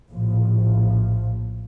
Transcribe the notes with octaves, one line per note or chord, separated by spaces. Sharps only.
A#1 A2 F3